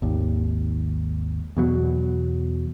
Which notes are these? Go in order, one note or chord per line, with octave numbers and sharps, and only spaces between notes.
G#1 D#2
E2 B2 F#3